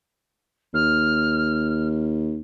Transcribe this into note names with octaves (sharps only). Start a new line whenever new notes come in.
D#2 F6